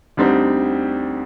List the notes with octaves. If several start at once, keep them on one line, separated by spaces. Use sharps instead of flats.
D2 D3 G3 C4 D#4